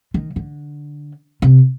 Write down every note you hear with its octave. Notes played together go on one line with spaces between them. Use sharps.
D#3
D3
C3